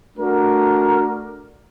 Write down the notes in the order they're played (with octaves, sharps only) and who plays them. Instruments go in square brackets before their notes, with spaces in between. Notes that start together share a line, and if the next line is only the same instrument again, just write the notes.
[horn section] A3 D4 F#4 A#4